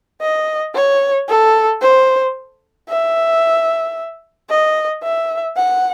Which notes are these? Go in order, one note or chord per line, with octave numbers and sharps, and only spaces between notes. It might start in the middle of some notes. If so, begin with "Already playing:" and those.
D#5
C#5
A4
C5
E5
D#5
E5
F#5